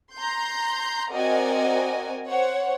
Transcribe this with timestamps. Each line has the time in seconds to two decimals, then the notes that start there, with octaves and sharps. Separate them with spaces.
0.15 A#5 C6 G6
1.11 C4 F#4 A#4 D5 D#5 G#5
2.27 C5 C#5 F#5